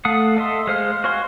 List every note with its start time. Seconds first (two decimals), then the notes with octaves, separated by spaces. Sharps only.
0.05 A3 A4 F5 F#5 D#6
0.37 A4 D#5 E5 C6
0.67 G#3 C5 F5
1.04 F#4 C5 F5 G#5 C6